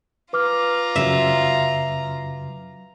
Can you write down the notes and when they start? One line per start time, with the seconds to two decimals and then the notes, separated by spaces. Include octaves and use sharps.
0.33 F4 B4 A#5 D6 F6
0.96 F#2 C#3 F#3 E5